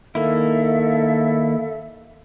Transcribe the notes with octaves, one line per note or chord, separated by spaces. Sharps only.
D#3 A#3 E4 A4 E5 F5